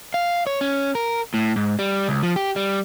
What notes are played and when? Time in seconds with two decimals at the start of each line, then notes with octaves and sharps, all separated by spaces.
0.14 F5
0.47 C#5
0.61 C#4
0.95 A#4
1.34 A2
1.56 G#2
1.79 G3
2.08 C#2
2.23 F3
2.36 G4
2.56 G3